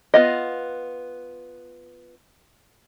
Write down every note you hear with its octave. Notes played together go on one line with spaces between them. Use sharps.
B3 F4 D#5